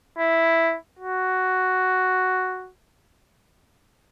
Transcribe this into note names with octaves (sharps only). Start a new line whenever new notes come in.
E4
F#4